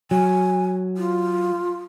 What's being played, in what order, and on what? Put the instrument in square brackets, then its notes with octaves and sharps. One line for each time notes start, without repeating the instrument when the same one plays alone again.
[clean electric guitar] F#3 [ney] G#5
[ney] F4